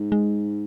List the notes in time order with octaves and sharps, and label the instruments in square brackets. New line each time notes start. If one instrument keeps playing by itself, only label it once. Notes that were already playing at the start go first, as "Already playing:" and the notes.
Already playing: [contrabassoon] G#2
[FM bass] G#3